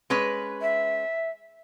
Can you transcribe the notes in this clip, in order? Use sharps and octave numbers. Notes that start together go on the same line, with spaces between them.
G#3 C#4 B4
E5